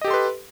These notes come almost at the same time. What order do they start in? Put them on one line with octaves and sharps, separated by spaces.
D#5 G4 A4 C6 B4